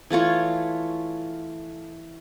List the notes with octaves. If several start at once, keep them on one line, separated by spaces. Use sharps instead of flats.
E3 A3 F4 C#5